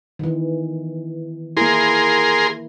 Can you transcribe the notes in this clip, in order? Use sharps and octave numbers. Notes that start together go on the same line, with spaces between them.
D#3 E3
A#3 E4 G#4 A#4 C6